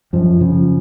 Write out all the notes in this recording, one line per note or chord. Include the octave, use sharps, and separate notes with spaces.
F#2 F3
C#3 F3